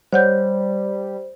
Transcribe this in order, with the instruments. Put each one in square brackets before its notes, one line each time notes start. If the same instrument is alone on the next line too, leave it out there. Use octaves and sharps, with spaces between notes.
[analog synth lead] G3 [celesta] C5 [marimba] C#5 F#5 G6